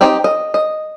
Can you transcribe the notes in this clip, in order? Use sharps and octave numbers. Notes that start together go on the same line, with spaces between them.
C4 D#4 G4
D#5
D#5